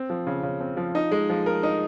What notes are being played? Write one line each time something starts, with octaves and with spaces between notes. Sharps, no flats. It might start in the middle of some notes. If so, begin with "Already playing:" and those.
Already playing: C4
F3
C#3
C#3
C4
F3
D#4
G#3
F3
A#4
D#4